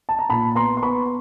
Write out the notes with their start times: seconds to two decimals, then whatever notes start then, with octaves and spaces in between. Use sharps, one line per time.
0.09 A5
0.19 A#5
0.30 A#2 A5 B5
0.55 B3 A#5 C6
0.77 C6
0.82 B3 B5 C#6